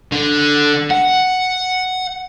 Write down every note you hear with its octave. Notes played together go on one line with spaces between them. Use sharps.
D3
F#5